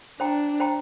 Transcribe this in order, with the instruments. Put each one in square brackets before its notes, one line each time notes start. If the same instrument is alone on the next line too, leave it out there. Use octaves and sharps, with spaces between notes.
[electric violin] D4 [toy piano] C5 G5 A#5
[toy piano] C5 G5 A#5